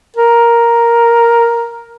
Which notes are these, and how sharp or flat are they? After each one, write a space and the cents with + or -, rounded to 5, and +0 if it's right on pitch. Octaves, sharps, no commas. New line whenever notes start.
A#4 +5